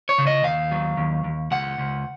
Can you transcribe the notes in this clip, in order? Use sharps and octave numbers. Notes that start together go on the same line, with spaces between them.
C#5
C#3
D#5
D#2 F5
F#3
D#2
D#2
C#2 F#5
C#2